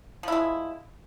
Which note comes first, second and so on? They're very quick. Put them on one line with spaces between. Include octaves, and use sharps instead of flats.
F3 E4 G#3